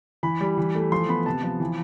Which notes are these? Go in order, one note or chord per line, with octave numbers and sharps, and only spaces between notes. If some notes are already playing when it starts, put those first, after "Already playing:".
E3 B5
G3
E3
A3
F3 C6
B3 B5
C3 A5
F3
E3